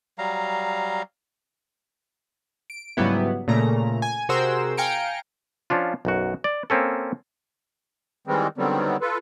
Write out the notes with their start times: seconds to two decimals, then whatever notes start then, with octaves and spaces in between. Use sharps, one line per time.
0.18 F#3 G3 F5 A#5
2.70 D7
2.97 G#2 C#3 F#3 G3 B3 E4
3.48 A#2 C#3 A3 A#5
4.02 G#5
4.29 C3 F#4 G#4 A#4 C5 E6
4.77 F5 G5 G#5 A#5 C#7 D7
5.70 F3 C#4 D4 F4
6.05 B1 F#2 F#4
6.44 D5
6.70 A#3 C4 C#4 A4
8.27 D#3 E3 G3 G#3 C4
8.58 D3 D#3 F#3 G3 B3 C4
9.01 F4 A4 B4